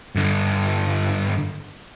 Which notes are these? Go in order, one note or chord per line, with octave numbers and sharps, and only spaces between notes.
G2 D3